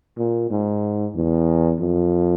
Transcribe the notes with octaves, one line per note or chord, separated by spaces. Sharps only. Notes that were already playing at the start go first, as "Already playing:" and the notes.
A#2
G#2
E2
F2